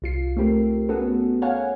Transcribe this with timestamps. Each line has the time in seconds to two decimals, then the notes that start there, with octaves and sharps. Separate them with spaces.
0.02 C2 F4 C7
0.37 A3 C4 G4 A#4
0.89 A3 B3 C#4 F#4 G#4 A4
1.42 C#5 F5 F#5 G#5